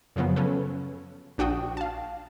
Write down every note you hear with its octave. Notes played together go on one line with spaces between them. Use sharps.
F#2 C#3 F3 F#3 B3
C#3 C#4 A4 B4
A#1 D4 F#4 G5 D#6
F5 A5